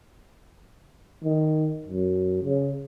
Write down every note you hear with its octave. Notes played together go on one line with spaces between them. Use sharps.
D#3
F#2
C#3